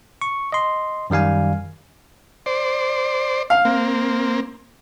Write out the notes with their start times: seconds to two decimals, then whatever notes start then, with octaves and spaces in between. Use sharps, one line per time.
0.21 C#6
0.52 D#5 C6
1.10 F#2 D#3 G3 F5 G#5
2.46 C5 D5
3.50 F5
3.65 A#3 C4